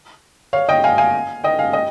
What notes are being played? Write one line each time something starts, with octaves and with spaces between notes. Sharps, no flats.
C#5 F5
D#5 G5
F5 G#5
F5 G#5
D#5 G5
F5 G#5
D#5 G5